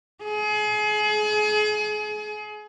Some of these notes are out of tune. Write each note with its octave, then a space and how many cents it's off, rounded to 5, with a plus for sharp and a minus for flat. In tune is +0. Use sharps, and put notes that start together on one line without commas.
G#4 +30